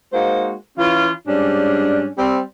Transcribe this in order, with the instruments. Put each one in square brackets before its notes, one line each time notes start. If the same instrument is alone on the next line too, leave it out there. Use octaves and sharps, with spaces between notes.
[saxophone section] G#3 A#3 D#4 F#4 C5
E3 C#4 F4
G#2 G3 C#4 D4
G3 C4